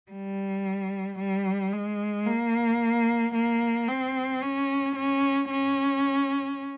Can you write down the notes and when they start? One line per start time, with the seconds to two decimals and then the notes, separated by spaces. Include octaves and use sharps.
0.12 G3
1.19 G3
1.73 G#3
2.27 A#3
3.35 A#3
3.89 C4
4.42 C#4
4.96 C#4
5.51 C#4